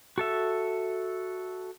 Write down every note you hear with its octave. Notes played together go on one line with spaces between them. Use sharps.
F#4 A4 E5